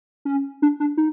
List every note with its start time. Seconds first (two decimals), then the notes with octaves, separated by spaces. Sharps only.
0.25 C#4
0.62 D4
0.80 D4
0.97 D#4